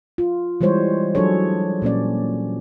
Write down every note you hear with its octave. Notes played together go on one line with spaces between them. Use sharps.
F4
E3 G3 G#3 C5 C#5
F#3 D4 G#4 A4 C#5
A#2 A#3 C#4 D5